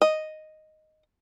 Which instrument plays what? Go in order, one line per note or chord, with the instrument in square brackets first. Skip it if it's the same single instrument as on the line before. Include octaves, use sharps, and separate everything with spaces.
[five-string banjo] D#5